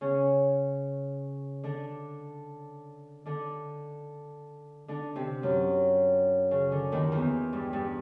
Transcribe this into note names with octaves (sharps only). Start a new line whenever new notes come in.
C#3 C#4
D3 D4
D3 D4
D3 D4
C3 C4
F#2 F#3
C#3
D3
D#2 D#3
E2 E3
G2 G3
G2 G3